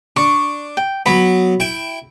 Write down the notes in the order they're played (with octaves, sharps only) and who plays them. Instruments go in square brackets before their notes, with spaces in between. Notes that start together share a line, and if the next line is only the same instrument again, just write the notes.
[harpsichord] D4 [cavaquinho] C#6
[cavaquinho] G5
[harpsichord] F#3 B3 [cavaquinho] B5
[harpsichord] E4 G5